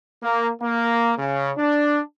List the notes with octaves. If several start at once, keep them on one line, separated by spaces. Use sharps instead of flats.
A#3
A#3
C#3
D4